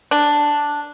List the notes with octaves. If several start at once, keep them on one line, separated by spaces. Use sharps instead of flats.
D4